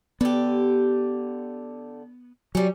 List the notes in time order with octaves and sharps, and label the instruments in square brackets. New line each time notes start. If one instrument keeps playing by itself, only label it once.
[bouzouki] D3 G4 [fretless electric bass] B3
[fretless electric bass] F#3 [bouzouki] G3 C#4